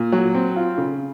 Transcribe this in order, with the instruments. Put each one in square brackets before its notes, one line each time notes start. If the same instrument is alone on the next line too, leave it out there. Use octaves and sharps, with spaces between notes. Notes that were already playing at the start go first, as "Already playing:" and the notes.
Already playing: [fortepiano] A#2
F#3
C4
F4
C#3